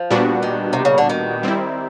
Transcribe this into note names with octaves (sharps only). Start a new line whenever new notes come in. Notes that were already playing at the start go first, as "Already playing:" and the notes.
Already playing: F3
A#2 G3 B3 D4 F#4
D#3
C3
C#3
D3
D#3
G3 C4 E4